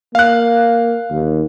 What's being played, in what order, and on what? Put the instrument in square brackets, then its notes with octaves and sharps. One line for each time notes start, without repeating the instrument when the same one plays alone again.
[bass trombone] A#3 [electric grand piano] F5 F#6
[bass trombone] D#2